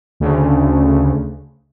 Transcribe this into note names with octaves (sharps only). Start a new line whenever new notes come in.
D2 C#3